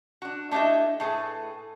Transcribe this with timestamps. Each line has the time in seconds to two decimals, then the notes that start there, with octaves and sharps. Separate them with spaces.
0.22 D4 F#4
0.51 A3 D4 E4 G4 D#5 E5
1.00 A2 A3 G#4 B4